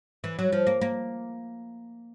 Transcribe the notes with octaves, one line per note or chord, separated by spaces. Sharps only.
E3
F#3
F3
A#3
A#3